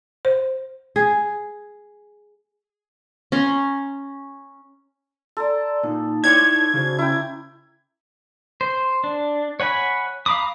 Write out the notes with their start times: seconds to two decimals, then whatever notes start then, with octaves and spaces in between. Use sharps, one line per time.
0.25 C5
0.96 G#4
3.32 C#4 A#5 C6
5.37 A4 D5 A#5 C6
5.83 A#2 D#4
6.24 E4 C#5 D5 C6 G#6
6.74 C#3 F#4 C5
6.98 C#4 E4 G5 A#5
8.61 C5
9.04 D4
9.60 C#5 F#5 G#5 B5
10.26 F5 A#5 B5 D6 D#6